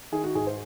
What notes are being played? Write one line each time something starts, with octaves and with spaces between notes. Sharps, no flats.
D#3 G#4
F#4
G#2 G#4
C5